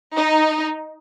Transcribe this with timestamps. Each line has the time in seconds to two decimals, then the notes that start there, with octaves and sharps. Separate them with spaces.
0.15 D#4